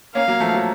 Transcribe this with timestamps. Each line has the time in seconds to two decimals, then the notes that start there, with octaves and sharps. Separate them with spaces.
0.15 A#3 C#4 F5
0.28 F#3 A#3
0.40 F3 A3
0.54 F#3